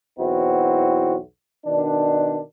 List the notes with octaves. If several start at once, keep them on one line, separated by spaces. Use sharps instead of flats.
B1 E2 C4 E4 F#4
B2 D#3 D4